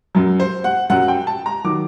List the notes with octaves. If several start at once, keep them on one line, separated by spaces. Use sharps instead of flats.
F#2 F#3
C5
F#5
F#2 F#3 F#5
G5
A5
A#5
D#3 F#3 D6